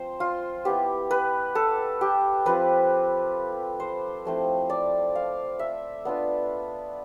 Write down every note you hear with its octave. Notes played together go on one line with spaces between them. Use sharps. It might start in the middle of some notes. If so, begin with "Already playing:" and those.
Already playing: F3 C4 C5
F4
B3 E4 G4
B4
A4
G4
F3 C4 F4 B4
C5
F3 A3 C4 E4
D5
F5
E5
B3 D4 F4